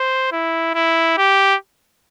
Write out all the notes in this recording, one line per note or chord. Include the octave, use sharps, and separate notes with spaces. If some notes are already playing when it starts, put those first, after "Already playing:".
Already playing: C5
E4
E4
G4